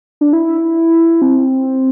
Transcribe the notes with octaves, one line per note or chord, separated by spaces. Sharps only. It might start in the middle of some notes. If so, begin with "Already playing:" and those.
D4
E4
C4